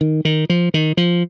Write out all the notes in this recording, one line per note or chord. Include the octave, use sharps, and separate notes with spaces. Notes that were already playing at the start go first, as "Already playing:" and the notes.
D#3
D#3
F3
D#3
F3